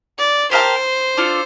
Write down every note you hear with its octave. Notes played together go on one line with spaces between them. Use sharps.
D5
G4 A#4 C5 E5 A5
D4 F4 A4